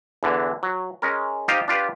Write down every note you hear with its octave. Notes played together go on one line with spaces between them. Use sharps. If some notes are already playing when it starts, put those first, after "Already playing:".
E2 D3 E3
F#3
G#3 C#4 A#4
D#4 F4 G4 C5 D#5 F5
D4 F4 G4 B4